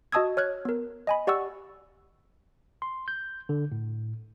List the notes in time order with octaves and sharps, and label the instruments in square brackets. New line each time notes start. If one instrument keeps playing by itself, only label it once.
[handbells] F#4 D#5 A5 D#6 E6 G#6
C#5 F6 F#6 G#6
B3 A#4
D#5 G#5 B5
G4 D5 F#5 C#6 E6
[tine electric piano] C6
G6
D3
A2